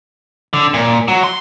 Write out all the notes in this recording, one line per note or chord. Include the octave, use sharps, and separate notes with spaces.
D3
A#2
F#3
C6